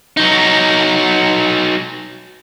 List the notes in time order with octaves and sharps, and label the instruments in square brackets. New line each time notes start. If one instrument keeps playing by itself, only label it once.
[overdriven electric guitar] F#3 D#4